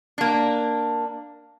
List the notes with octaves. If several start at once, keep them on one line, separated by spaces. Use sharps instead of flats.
A#3 D4